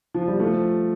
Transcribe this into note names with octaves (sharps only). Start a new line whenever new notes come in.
F3
G3
F3 A3